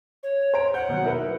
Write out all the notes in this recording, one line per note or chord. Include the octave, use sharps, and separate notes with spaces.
C#5
C5 A#5 D7
F#5 G6
B2 F#3
E4 A#4 B4